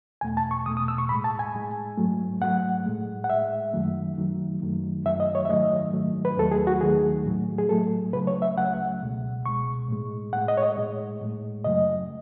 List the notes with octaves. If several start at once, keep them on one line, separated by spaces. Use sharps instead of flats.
E2 B2 A3 G#5
A5
C#6
E2 B2 A3 D#6
D#6
E6
C#6
A2 G#3 B5
A5
G#5
A2 G#3
G#2 F#3 A3
G#2 F#3 A3 F#5
A2 G#3
F#5
A2 G#3 E5
F#2 D#3 F#3 A3
F#2 D#3 F#3 A3
F#2 D#3 F#3 A3
F#2 D#3 F#3 A3 E5
D#5
C#5
E5
G#2 D#3 F#3 A3 D#5
G#2 D#3 F#3 A3
B4
D#2 D#3 F#3 A3 A4
G#4
F#4
D#2 D#3 F#3 A3 G#4
A2 F#3 A3
G#4
A2 F#3 A3 A4
C#2 C#3 F#3 A3 B4
C#5
E5
C#2 C#3 F#3 A3 F#5
C#2 B2 G#3
C#2 B2 G#3 C#6
A2 G#3
A2 G#3 F#5
D#5
C#5
D#5
A2 G#3
A2 G#3
F#2 C#3 F#3 A3 D#5